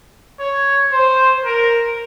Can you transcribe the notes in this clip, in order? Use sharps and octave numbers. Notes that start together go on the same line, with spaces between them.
C#5
C5
A#4